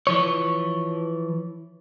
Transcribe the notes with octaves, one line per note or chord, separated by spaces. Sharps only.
E3 F3 C#5